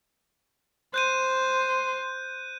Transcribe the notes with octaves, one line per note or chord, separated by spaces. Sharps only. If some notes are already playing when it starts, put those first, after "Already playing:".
C5 F#6 G6 D#7